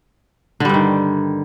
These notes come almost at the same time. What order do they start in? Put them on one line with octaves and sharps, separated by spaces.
D3 G3 G2 D#3